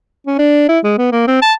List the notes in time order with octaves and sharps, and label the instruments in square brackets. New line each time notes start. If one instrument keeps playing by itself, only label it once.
[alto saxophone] C#4
D4
E4
G#3
B3
A#3
C4
A5